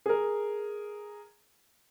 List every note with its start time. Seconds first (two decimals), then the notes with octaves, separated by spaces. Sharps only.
0.06 G#4 A#4